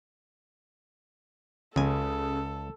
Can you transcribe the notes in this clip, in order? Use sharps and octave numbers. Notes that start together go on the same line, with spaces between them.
C#2 C#3 A4 G#5